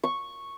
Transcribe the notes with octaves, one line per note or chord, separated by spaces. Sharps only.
C#6